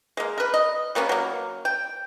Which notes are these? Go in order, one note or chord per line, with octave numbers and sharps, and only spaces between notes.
G#3 A#3
A#4 B4
D#5
G3 A#3 B3 C#4
F#3 A#3
G5